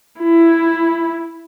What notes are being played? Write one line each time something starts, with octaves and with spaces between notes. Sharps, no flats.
E4